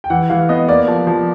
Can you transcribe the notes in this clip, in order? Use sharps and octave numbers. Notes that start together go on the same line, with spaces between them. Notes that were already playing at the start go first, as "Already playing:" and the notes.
G5
E3 F#5
E3 F5
B3 D#5
A#3 D5
F3
F3